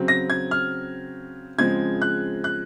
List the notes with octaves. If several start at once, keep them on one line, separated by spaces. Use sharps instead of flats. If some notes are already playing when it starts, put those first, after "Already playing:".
Already playing: C#3 F#3 C4
A#6
G#6
F6
C#3 F3 G#3 C4 G#6
F#6
F#6